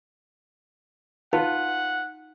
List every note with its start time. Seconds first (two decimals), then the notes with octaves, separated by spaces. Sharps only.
1.33 D#4 F4 B4 F#5